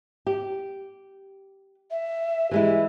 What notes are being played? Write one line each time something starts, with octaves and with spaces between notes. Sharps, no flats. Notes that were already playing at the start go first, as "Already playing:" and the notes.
G4
E5
E3 G#3 E4 G4